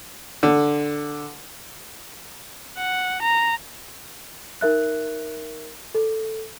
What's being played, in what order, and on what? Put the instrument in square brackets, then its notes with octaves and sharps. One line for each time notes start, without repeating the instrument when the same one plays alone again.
[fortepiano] D3
[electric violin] F#5
A#5
[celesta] D#4 A#4 E5 F#6
A4